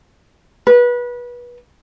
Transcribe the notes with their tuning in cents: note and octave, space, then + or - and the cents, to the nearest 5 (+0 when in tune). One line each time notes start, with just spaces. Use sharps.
B4 -25